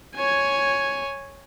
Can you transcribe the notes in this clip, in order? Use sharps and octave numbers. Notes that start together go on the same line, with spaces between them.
C#5 G#5